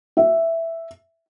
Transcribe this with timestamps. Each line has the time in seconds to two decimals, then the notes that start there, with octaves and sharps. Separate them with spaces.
0.17 E5